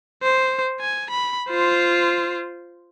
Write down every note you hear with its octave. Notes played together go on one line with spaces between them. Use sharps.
C5
G#5
B5
F4 C5